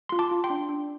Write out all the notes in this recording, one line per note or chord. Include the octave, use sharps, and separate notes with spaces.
F4 C6
A5 D6
F4
G5 C6
D4
D4